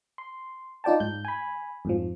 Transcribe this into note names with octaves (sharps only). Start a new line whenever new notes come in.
C6
D#4 F4 D5 G5 A5
G#2 G6
G#5 B5
F2 G#2 F3